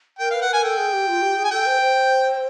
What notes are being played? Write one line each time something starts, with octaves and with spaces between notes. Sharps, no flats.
A#4 G5
B4 F5
F#5
A#4 G#5
A4 G5
G#4
G4
F4
G4
G#4
G#5
A4 G5
C5
C5